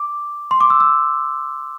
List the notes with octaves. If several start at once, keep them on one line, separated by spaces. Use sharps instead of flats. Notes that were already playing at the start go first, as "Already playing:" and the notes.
Already playing: D6
C6
D6
E6
E6